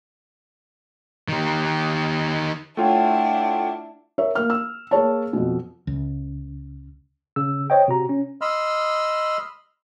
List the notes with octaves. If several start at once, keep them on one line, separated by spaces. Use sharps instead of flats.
D#3 G4
A3 D4 E4 F4 C#5 F#5 G5
A#4 C#5 E5
A#3 F6
E6
A#3 G#4 C#5 A5
F2 B2
C#2
C#3 E6
C5 C#5 D#5 G5
C3 F#4 A#5
C#4
D#5 B5 C6 E6 F6